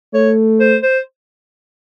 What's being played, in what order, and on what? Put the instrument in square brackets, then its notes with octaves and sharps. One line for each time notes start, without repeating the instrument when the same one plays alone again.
[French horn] A3 [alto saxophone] C#5
[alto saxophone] C5
C5